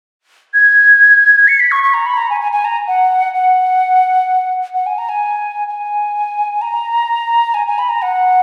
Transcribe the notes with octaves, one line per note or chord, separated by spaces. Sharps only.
G#6
C#7
B6
C#6
C#6
A#5
B5
A#5
G#5
G#5
G#5
A#5
F#5
F#5
F#5
G#5
A#5
G#5
G#5
A#5
G#5
G#5
B5
A#5
F#5